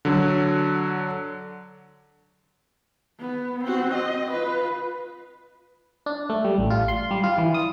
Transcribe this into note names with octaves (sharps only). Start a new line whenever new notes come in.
D3 F#3
B3
C4 F#4
D#5
F4 B4
D4
A3
G3
A1
F4
C6
G3
F4
E3
D#6